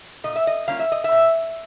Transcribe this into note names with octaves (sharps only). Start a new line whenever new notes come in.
A#2 D#5
E5
D#5
G3 A#3 C#4 F4 F5
E5
D#5
E5
A#2